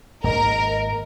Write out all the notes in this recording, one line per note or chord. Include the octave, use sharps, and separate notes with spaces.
G#1 G#2 A#3 A#4 D#5